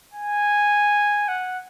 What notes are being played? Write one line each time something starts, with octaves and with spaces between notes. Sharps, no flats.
G#5
F#5